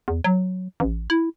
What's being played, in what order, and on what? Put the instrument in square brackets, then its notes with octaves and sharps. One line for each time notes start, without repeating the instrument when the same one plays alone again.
[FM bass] E2
F#3
A1
E4